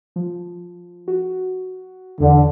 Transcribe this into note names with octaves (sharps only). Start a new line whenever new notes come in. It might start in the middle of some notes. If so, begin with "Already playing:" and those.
F3
F#4
E2 D3